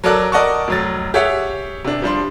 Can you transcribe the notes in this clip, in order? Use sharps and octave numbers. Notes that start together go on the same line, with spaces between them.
F#3 A4 A#4 D5 F#6
A#4 D5 D#5 F#5 A5 C#6
F1 F#3 A6
G4 G#4 C#5 E5 F#5
C3 D4
F3 G3 D4 C6